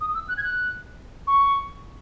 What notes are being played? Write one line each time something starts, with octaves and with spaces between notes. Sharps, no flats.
D#6
E6
F#6
G#6
F#6
C#6